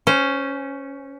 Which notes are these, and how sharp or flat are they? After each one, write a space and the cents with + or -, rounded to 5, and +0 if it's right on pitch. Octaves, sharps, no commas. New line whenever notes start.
C#4 +0 C5 -25